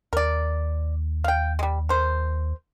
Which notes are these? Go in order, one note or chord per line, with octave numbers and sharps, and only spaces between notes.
D#2 A#4 D5
F5 G5
G3 G#3
A#4 C5